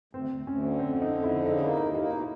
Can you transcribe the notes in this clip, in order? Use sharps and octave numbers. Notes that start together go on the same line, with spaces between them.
D2 C4
D2
D2 C#4
D3
F2 C4
D3
D#4
F2
D3 E4
C#3 D#4
A#3 E4
D#2 D#4
A#3 D#4
B2 D#4